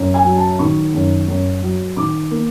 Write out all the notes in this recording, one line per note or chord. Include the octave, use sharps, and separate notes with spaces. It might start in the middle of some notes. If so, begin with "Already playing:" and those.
Already playing: F#2
G#5
F#3
A5
D#3 C#6
F#2
F#2
F#3
D#3 D6
A#3